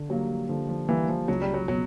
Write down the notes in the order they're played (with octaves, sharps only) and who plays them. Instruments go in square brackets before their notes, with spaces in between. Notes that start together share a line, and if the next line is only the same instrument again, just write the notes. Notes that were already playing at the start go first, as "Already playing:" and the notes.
Already playing: [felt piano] D3
[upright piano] F#3 [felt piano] G3 A#3
[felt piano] D3 [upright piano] F3
[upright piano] F3
[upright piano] E3 [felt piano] G3 A#3
[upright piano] F3
[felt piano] C#2 [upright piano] F#3
[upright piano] G3
F#3
[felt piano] B2 [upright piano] F#3